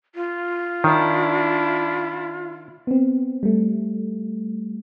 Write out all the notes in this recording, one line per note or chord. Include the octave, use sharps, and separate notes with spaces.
F4
D#3 D4 E4
B3 C4
G3 A3